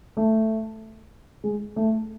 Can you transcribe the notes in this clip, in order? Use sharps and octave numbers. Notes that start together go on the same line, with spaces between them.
A3
G#3
A3